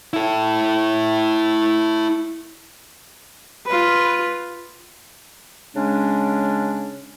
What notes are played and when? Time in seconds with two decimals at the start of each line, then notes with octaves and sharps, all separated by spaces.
0.13 E4 A4
3.66 F4 B4
5.76 C#3 G#3 C#4 D4